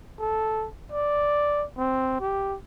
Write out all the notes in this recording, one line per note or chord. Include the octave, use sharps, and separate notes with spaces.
A4
D5
C4
G4